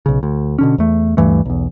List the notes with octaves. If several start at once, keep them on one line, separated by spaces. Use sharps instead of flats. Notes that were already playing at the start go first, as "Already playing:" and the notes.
B1 C#3
D2
B2 D3 C#4
E2 A3
D2 G2 E3 A3
B1 E2